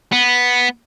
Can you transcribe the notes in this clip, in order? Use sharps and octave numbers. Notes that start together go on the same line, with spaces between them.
B3